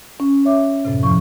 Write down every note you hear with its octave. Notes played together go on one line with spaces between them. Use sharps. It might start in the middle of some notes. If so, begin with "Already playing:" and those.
C#4
C#5 E5 D6
F#2 A2 C3
E2 F3 C#6